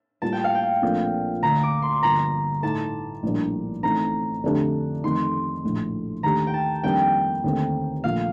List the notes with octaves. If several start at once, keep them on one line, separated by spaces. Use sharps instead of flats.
A2 G3 A#3 F4 A5
G5
F5
G5
A#1 A#2 A3 C4
D2 D3 A3 A#5
D6
C6
G1 G2 D3 F3 A#3 A#5
A2 A3 D#4 A5
A#1 A2 G3 A#3 D4
A1 A2 A3 C4 D#4 A#5
F2 D3 A3 D4 G4
F2 D#3 A3 D#4 C6
A#1 A2 A3
D#2 D#3 A3 D4 G4 A#5
G5
A5
F2 D#3 G3 A#3 D4 G5
D#2 D3 A3 C4
A#1 A#2 F3 A3 F5